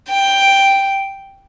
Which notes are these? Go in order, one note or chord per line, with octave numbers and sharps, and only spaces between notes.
G5